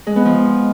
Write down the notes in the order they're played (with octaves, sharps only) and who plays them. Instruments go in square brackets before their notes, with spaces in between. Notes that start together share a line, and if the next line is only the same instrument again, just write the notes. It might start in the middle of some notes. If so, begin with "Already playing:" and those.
[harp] G#3
B3
F3